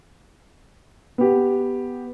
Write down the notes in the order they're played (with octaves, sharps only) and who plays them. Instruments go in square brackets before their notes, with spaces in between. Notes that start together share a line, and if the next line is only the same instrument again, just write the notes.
[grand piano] B3 G4